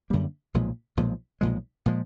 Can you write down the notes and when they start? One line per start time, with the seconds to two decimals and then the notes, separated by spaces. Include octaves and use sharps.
0.10 F#2 D3 G3 A#3
0.54 B1 A#2 F3 G#3
0.97 B1 A#2 F3 G#3
1.41 B1 A#2 F3 G#3
1.86 A#2 F3 G#3